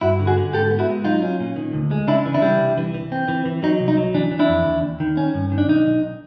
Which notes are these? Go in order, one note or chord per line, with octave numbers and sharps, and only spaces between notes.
G2 E4 F#4
D3
F#4 G#4
D3
G#2 G4 A4
B3
E4 F#4
G#3
F#3 D#4 F4
C#4
A#2
D#3
D2
G#3
C#3 D4 E4
E3
D4 E4
G3
C2
E3
E3
C4
E3
E3
F#3 D#4
C2
D#4
F#3
E3 D4
E3
D4 E4
F2
D#2
D#2
D#3
C#4
G2
D#3
D4
B1 D#4
B1